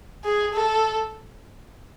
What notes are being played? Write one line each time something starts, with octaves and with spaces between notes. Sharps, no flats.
G#4
A4